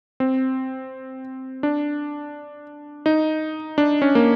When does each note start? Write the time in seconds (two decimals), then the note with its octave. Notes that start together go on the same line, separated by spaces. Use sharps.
0.20 C4
1.63 D4
3.06 D#4
3.78 D4
4.02 C#4
4.15 A#3